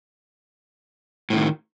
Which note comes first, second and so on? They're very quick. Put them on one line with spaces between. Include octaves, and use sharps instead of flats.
A2 E3 D#3